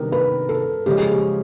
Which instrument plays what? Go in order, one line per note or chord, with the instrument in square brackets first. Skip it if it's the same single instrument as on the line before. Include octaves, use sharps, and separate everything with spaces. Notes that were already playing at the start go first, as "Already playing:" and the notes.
Already playing: [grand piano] C3 D#3 G3 B3 D4 [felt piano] A#4
[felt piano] B4
A4
[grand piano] C#3 F3 G#3 C#4 [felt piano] G4
[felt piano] G#4
G4